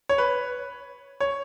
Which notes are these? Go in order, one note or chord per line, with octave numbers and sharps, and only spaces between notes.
C#5
B4
C#5